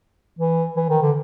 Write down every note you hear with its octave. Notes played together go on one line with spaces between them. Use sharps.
E3
E3
D#3
D3